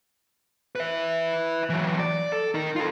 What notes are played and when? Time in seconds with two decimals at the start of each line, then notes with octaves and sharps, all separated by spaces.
0.75 B4 E5
1.69 E3 F#3
2.00 D5
2.33 A4
2.54 D#4 A#4
2.76 F4 A4